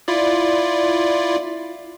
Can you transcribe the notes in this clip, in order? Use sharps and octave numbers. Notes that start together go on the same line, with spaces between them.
E4 F4 D5